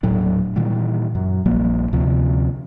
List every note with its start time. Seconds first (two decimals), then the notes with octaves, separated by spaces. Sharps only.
0.03 D#1 A2 F#3 D4
0.56 A#2 D#3 E3 G3
1.15 F#2
1.46 A#1 F3 G3 A#3
1.93 D2 C3 F3